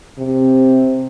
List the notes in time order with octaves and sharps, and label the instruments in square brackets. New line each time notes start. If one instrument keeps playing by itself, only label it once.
[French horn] C3